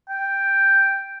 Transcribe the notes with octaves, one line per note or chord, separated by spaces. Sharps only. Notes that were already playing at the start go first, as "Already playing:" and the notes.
G5